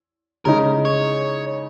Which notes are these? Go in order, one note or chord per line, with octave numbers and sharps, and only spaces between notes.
C#3 G#3 D#4 A#4
C#5